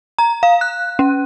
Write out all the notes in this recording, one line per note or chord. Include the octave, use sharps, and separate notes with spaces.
A#5
F5
F#6
C#4